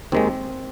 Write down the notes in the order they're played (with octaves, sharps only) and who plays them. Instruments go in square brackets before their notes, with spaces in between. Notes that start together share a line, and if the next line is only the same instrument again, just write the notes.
[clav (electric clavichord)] D#2 D#3 G#3 C4